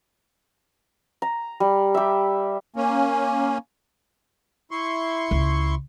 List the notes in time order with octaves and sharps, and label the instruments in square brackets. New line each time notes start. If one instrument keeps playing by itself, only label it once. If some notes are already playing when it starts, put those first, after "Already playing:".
[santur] A#5
G3
G4 E5
[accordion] A#3 C#4
E4 C6 C#6
[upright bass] C#2